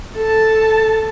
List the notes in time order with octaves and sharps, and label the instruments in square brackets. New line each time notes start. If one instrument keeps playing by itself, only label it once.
[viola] A4 A5